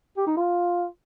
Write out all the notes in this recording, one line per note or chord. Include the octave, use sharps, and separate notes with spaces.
G4
D#4
F4